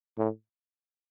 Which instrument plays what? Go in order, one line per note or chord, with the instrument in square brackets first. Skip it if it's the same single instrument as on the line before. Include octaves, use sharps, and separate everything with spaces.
[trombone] A2